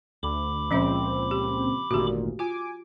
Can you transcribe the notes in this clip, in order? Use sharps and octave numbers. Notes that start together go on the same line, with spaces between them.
D2 B5 D6
C#2 A#2 F3 C4 C#4 E5
G4
G#1 D2 A#2 F#4 G4
F4 G#5 D6